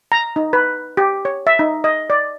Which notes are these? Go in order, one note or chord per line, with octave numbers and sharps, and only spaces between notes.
A#5
D#4
B4
G4
C#5
E5
D#4
D#5
D5